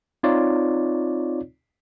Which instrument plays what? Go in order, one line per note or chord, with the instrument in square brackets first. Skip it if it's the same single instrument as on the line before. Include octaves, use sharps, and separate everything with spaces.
[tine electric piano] C4 D#4 F4 C#5 D5